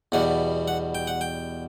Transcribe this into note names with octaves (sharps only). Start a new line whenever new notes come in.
E2 B2 G3 F#5
F#5
G5
F#5
G5